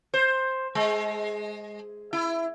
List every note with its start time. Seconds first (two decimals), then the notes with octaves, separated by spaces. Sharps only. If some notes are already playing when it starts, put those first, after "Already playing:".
0.14 C5
0.75 G#3
2.13 E4